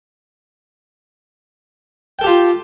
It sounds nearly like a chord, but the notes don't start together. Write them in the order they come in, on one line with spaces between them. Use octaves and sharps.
G5 A4 G4 F4